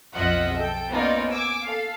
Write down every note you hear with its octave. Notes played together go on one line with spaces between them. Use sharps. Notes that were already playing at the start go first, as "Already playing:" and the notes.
B1 F2 F4 D#5 E5 F#5
A4 G5
A#3 B3 C#4 D#4 F4 D5
G#5 D6 E6
A4 F5